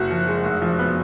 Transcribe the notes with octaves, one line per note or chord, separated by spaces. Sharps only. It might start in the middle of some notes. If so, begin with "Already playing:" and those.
Already playing: F#1 F#4
F3
G#3
F1
F3
B3